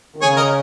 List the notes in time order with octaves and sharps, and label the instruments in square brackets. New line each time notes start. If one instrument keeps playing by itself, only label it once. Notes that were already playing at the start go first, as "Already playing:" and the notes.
[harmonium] D#3
[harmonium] C#3 [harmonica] G#4 C#5
[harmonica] A#4 D#5